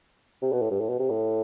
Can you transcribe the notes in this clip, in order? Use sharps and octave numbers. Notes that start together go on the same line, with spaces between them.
C3
B2
A2
G2
A2
B2
C3
A2